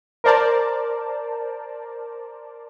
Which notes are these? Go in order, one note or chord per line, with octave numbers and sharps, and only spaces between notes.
A#4 C5 D5 A5